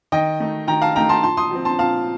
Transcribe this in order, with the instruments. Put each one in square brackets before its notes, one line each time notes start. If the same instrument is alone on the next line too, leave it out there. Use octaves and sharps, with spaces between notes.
[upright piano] D#3 D#5 G5
A3 D#4
D#3 G5 A#5
F5 A5
A3 D#4 G5 A#5
A5 C6
A#2 A5 C6
C6 D#6
F3 C4
A5 C6
A#2 F5 A5